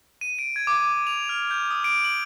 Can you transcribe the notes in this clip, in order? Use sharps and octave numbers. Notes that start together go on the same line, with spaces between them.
D#7
D7
G#6
D6
D6
F7
F6
G6
D#6
D7
F#7